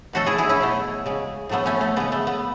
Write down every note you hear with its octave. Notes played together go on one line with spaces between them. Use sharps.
B2 F#3 A3 F#4 A4
E4 G#4
E4 G#4
C#4 E4
B2 F#3 A3
C#3 G#3
A2 F#3 A3 B3
A3 C#4
A3
C#3 G#3 B3
A3
B3